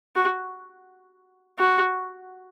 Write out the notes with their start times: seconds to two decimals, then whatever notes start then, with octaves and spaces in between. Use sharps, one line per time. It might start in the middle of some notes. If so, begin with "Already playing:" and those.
0.16 F#4
1.59 F#4